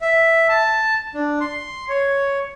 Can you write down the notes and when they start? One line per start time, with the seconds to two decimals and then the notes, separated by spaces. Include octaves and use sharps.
0.01 E5
0.49 A5
1.15 D4
1.41 C6
1.89 C#5